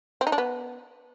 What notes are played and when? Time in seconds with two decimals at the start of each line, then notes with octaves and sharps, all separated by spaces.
0.21 C4
0.27 D#4
0.32 D4
0.38 B3